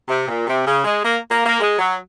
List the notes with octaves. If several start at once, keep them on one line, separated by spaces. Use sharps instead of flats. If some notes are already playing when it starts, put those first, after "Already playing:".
C3
A#2
C3
C#3
G#3
A#3
A#3
A#3
G#3
F#3